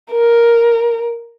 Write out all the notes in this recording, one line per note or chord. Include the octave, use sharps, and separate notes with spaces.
A#4